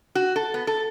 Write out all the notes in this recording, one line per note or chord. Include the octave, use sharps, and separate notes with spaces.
F#4
A4
B3
A4